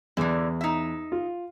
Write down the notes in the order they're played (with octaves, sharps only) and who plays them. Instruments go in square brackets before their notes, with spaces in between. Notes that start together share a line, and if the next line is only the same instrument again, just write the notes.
[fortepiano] E2 [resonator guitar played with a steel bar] D3 E3
[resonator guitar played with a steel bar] D#4 E5
[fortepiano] F4